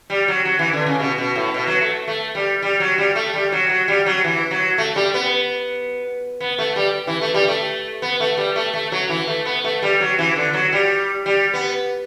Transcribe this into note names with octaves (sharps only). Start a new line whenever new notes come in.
G3
F#3
F#3
E3
D3
C#3
B2
B2
A2
B2
F#3
A3
A3
G3
G3
F#3
G3
A3
G3
F#3
F#3
G3
F#3
E3
F#3
A3
G3
B3
B3
A3
G3
E3
A3
G3
A3
B3
A3
G3
A3
A3
F#3
E3
A3
B3
A3
G3
F#3
E3
D3
F#3
G3
G3
B3